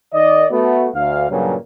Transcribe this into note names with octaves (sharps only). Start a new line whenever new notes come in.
D#3 D5 D#5
A3 B3 F#4
D2 F5
G2 A#2 C#3 F#3